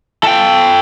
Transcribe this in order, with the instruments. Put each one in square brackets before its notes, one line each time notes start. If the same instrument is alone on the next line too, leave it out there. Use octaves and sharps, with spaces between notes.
[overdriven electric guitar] A4 G5